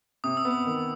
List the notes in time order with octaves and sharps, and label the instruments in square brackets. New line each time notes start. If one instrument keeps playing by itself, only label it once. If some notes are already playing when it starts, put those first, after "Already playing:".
[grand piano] C3 [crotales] D#6
[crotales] E6
[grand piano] B3
[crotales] D#6
[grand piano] D#3